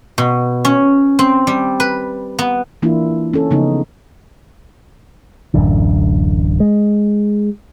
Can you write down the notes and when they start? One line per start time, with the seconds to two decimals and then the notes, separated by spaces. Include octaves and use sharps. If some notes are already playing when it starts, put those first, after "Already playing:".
0.18 B2
0.65 C#4
1.19 C4
1.47 G3
1.80 B4
2.39 B3
2.82 E3 A#3 D4 E4 F4
3.33 C#4 A4
3.51 C#3 F3 B3 D#4
5.54 D1 A1 F#2 D3
6.60 G#3